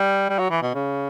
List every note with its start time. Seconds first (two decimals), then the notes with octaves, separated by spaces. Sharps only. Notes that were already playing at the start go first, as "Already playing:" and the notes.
Already playing: G3
0.29 G3
0.39 F#3
0.50 E3
0.62 B2
0.74 C#3